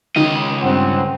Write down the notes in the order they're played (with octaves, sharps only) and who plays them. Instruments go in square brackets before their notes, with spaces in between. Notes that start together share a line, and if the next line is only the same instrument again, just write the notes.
[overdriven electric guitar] C#2 D#5 [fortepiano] D#3
[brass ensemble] G2 C4 F#5